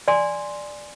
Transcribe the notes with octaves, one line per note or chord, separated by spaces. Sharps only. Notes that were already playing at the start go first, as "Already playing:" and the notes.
D5 G#5 C6